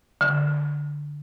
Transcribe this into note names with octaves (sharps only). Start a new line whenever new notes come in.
D3